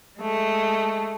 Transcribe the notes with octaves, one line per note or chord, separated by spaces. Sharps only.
G#3 A3